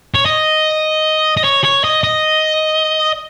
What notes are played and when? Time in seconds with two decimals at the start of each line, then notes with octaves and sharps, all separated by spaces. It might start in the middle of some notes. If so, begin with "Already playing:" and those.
0.15 C#5
0.26 D#5
1.37 D#5
1.44 C#5
1.64 C#5
1.84 D#5
2.03 D#5